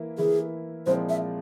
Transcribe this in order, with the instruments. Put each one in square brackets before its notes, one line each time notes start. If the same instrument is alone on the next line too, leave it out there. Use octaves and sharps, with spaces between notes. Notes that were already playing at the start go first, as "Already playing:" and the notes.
Already playing: [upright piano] E3 A#3 E4
[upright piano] E3 A#3 E4 [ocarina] G#4
[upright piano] A#2 F3 G#3 C4 E4 [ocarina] C5
[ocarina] E5